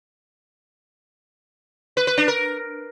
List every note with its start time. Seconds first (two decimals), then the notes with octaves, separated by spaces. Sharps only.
1.97 B4
2.07 B4
2.17 D4
2.28 A#4